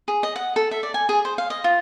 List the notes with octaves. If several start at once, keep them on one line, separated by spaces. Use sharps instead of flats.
G#4
D#5
F#5
A4
E5
D5
G#5
G#4
C5
F5
D#5
F4